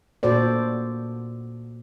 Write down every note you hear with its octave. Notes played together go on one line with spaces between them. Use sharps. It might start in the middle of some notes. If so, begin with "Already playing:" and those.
A#2 F#4 A4 C5 D5